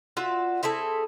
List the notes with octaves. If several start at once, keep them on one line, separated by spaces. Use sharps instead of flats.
F4 F#4 D5 E5
C4 E4 G#4 A4